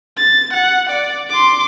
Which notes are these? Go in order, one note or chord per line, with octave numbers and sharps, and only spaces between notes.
A6
F#5
D5
C6 D6